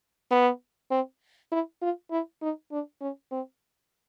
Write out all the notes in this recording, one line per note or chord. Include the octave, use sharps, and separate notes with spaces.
B3
C4
E4
F4
E4
D#4
D4
C#4
C4